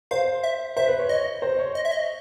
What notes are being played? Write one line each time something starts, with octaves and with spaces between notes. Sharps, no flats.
C5 F5
E5
C5 E5
B4
C#5
C#5 D#5
C5
C#5
D#5
E5
D#5